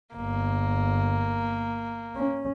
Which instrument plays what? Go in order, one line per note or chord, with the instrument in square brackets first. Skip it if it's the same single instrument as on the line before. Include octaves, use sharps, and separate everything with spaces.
[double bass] G1 [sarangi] A#3
[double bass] C#4